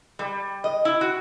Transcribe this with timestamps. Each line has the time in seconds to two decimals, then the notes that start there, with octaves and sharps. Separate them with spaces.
0.19 G3
0.64 D#5
0.85 E4
1.01 F#4